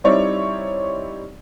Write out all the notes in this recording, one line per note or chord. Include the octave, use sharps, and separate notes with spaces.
G3 C4 D#4 E4 C#5 D5